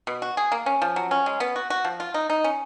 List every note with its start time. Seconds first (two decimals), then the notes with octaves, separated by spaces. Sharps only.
0.07 B2
0.22 F#4
0.37 G#4
0.52 A#3
0.66 C#4
0.82 F3
0.96 F#3
1.11 C#4
1.26 G#3
1.40 B3
1.56 F#4
1.70 F#4
1.85 F3
2.00 F4
2.14 D#4
2.30 D#4
2.44 C#4